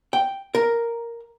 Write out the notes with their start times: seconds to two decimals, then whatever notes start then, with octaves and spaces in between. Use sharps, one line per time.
0.13 G5
0.55 A#4